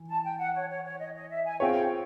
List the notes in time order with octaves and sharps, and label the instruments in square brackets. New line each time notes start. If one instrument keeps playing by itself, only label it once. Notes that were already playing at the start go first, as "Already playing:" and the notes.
Already playing: [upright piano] E3
[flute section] A5
G5
F#5
C#5
C#5
C#5
D#5
D#5
E5
G#5
[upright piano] C4 F4 G#4 C#5 [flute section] G5